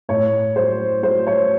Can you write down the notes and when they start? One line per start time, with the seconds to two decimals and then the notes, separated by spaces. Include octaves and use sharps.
0.09 A2 C#5
0.56 F#3 C5
1.03 F#3 C5
1.27 C#5